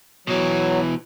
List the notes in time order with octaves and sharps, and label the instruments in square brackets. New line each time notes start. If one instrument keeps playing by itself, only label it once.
[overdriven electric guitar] B2 E3 [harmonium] F#3